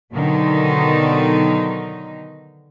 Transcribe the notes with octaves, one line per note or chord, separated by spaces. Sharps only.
B2 D3 D#3 F#3 D#4